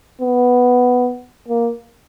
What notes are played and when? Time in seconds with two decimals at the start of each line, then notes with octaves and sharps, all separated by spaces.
0.22 B3
1.48 A#3